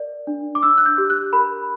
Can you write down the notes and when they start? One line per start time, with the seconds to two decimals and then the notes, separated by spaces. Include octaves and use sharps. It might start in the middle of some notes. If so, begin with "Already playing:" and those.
Already playing: A#4 D5
0.27 D4
0.55 D6
0.63 D4 E6
0.78 F#6
0.86 G6
0.98 G4
1.10 F#6
1.33 A#4 B5